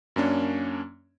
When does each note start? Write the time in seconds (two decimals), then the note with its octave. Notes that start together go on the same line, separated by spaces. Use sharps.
0.16 F#2 A#3 C#4 D4